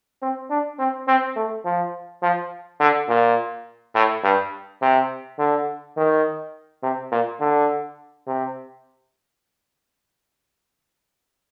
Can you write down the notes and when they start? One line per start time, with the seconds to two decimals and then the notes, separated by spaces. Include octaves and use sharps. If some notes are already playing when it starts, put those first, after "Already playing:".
0.22 C4
0.50 D4
0.79 C4
1.07 C4
1.36 A3
1.65 F3
2.22 F3
2.80 D3
3.09 A#2
3.95 A2
4.24 G2
4.82 C3
5.39 D3
5.97 D#3
6.83 C3
7.12 A#2
7.40 D3
8.27 C3